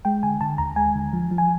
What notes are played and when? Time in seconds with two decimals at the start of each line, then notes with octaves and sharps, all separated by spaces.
0.05 G#3 G5
0.23 D3 G#5
0.41 D3 A5
0.58 D#2 A#5
0.76 G#3 G#5
0.95 D3
1.13 F3
1.31 F3
1.38 G#5